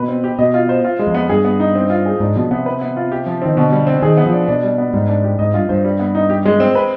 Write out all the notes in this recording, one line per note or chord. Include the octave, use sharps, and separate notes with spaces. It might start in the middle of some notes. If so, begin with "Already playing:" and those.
Already playing: B2 B4
C4
G4
B2 D#5
F4
C5
F4
G#3
F2
B3
G2 G#4
B3
D#4
C4
F4
G#4
G#2 D4
B2 F3
C3 B3
B4
B3
F4
G4
F3
D#3 C4
B2 D3
G3
C4
D#3 G#4
B3
F3
D4
B2 D4
G3
B3
G#2 G3
D4
G4
G#2 D#5
G2 F4
G2 C5
G3
B3
D#4
G4
G#3
C4
B4